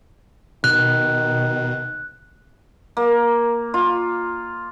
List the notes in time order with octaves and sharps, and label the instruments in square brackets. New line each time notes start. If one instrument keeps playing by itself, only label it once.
[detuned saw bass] B2 [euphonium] D#3 [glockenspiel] F#6
[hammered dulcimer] A#3
F4